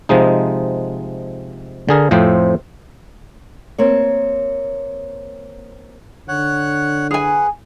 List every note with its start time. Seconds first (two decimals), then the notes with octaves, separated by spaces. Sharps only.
0.09 C3 F3 G#3 D#4
1.89 D3 G#4 A#4
2.11 F2 A2 F3 C4 C5
3.78 A#3 C4 C#5
6.28 D3 C#5 F#5 F#6
7.11 G#4 B4 F#5 G#5